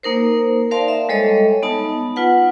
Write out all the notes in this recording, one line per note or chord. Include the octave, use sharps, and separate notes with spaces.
A#3 D#4 A#4 C5
A#4 C5 D5 F5 A5 C6
E5
G3 G#3 A4 C#5 D#5
B3 D#4 A5
F4 B4 F#5